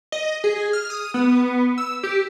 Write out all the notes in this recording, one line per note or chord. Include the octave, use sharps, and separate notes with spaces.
D#5
G#4
F6
D#6
B3
E6
G4